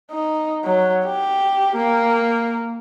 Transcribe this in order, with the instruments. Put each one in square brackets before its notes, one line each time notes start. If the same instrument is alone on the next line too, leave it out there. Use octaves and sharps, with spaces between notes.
[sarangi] D#4
F#3
G4
A#3